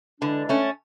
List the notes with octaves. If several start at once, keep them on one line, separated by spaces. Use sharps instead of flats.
D3 E3 G#3 D4
A3 C#4